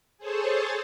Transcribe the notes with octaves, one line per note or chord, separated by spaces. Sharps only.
G#4 A4 C5 C#5 A5